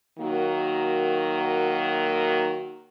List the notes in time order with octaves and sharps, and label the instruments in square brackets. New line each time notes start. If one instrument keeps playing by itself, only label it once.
[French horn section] D#3 F#3 A#3 F#4